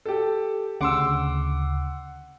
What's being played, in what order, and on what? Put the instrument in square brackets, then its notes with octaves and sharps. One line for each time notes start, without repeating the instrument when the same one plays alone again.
[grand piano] G4 A4
[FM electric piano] D2 C#3 D6 [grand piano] F#5 C6 E6